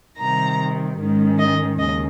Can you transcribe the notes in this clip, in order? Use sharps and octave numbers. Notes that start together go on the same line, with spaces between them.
C3 D#3 G3 A#5
G#2 D#3 G#3 C#4
D#5
D#2 C#3 D#5